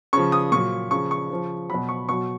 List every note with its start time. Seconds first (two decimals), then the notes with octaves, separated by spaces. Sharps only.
0.13 C#3 F3 C#6
0.32 D#6
0.52 A#2 F#3 C#6
0.91 C#3 F3 C#6
1.11 C#6
1.30 C#3 F3
1.70 B2 F#3 B5
1.89 C#6
2.09 B2 F#3 C#6